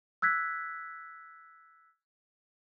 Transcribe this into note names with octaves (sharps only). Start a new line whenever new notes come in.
E6 F#6 G#6 B6